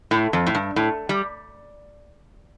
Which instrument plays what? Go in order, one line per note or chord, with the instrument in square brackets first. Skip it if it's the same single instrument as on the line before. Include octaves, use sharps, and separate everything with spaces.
[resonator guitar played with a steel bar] A2
F2
A2
G2
A2
G3